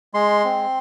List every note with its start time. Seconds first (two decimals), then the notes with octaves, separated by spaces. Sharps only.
0.14 G#3 C6
0.45 C4